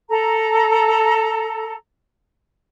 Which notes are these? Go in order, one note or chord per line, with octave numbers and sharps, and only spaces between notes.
A4 A#5